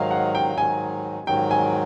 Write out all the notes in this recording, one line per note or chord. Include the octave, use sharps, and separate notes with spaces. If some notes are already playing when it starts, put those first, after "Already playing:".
Already playing: G#2 D#3 F#3 D#5 F5
F#5
G5
G#2 D#3 F#3 G#5
G#2 D#3 F#3 G5
G#5